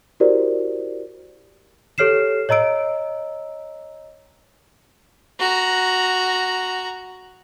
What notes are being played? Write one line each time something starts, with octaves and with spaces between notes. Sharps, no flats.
E4 F#4 G4 A#4 C5 D5
G4 A4 C#5 F6 C7 E7
C#5 D#5 A#5 E6 D7
F#4 A#5